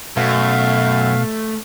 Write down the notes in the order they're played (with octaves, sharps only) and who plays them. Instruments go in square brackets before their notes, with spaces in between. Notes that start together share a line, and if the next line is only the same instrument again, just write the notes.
[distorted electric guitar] F#2 [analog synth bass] B2 [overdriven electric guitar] A3 [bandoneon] F5